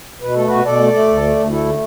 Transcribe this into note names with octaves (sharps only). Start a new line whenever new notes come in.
B2 B4
A3 A4
B2 F#4 B4
B2 A4 D5
A3
A3
D2
A3
D2
A3 E4 A4
D3